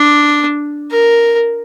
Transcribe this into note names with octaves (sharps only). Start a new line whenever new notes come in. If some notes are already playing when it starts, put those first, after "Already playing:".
Already playing: D4
A#4